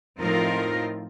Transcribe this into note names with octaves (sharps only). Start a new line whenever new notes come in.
A2 F3 C4 D#4 F4 A#4